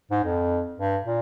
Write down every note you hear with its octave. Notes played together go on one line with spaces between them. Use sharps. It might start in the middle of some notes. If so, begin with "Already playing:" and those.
G#2
F2
G2
A#2